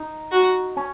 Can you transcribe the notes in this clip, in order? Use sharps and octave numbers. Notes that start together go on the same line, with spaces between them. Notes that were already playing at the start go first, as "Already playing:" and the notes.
Already playing: D#4
F#4
C#4